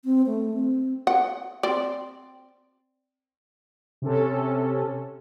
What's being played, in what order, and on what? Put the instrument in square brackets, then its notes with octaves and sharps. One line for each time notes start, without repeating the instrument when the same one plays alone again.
[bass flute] C4
A3
C4
[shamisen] F#5
C4 D5
[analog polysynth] C3 C#4 A4